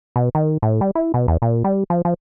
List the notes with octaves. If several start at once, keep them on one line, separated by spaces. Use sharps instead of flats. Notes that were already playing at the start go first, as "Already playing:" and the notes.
B2
D#3
A2
G3
E4
B2
E2
A#2
G3
F3
F3